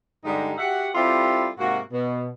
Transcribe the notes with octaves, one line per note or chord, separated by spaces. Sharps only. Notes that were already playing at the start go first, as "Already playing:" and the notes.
G2 D3 G3 G#3 D#4
F#4 G4 E5 F#5
G3 C4 E4 F4 G4 A4
G#2 C3 A#3 F#4
B2